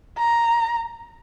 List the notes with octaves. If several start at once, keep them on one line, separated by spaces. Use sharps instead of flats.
A#5